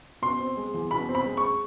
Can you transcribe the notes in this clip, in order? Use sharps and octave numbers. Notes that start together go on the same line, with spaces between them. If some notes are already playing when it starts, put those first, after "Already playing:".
B2 C6
C4
G#3
E2
B2 B5
C4
B5
G#3
C#6